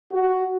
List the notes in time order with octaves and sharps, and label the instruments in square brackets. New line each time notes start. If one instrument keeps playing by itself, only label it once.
[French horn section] F#4